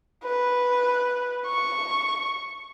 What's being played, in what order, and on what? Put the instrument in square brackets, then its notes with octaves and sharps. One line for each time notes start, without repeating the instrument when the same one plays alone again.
[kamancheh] B4
C#6